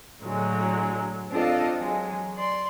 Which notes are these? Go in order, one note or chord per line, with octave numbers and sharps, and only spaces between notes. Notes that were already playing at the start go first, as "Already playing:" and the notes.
A2 D3 F#3 G#3
C4 D4 F4 A4 D#5 F5
F#3 G#3
D5 C6